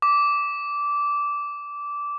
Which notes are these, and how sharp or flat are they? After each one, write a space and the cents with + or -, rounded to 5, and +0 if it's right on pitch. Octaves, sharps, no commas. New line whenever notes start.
D6 -15